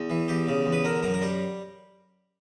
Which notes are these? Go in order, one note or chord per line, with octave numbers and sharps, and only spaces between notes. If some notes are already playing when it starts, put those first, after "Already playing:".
Already playing: E2
E3
E2 G4
C#3
E2
B4
D3 A#4
F#2 A#4
A#4
G3 G4